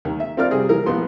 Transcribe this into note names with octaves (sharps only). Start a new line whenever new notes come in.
D#2 D#3
E5
C4 F4 A#4 D5 F6
C3 G3 G#4
E3 A#4
A#1 F3 B3 C6